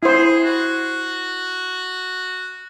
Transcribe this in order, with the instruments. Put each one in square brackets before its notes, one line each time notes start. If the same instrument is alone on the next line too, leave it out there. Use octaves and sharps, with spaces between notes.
[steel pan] E4 C5 [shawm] G#4
[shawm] F#4